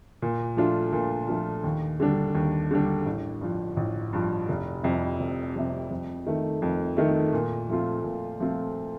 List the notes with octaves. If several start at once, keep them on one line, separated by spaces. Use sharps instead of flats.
A#2
F3 A3 D4 F4
A#2
F3 A3 D4 F4
D#2
D3 G3 D4
D#2
D3 G3 D4
A1
G2 F3
A1
G2 F3
F1
F2 C3
F1
F2 C3
F2
D#3 A3
F2
D#3 A3
A#2
F3 A3 C4 F4
A#2
F3 A3 C4 F4